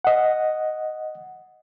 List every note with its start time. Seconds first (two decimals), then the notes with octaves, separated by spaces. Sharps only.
0.05 D#5 F#5